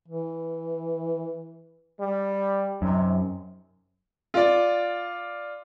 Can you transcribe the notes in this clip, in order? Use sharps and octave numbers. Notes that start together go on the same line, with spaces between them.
E3
G3
F#2 C3 D#4
F4 D5